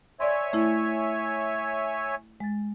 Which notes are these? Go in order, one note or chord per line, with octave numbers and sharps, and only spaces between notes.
C#5 D5 E5 G#5 C6
A3 E4
G#3 A6